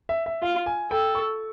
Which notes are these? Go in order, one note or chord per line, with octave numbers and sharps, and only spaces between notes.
E5
E5
F4 F5
G#5
A4 G5
C#6